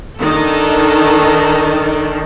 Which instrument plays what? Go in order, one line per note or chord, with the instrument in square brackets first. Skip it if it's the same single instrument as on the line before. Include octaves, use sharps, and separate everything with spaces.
[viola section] D#3 [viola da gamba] D4 A4